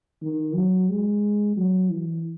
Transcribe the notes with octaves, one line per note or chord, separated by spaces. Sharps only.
D#3
F#3
G#3
F#3
E3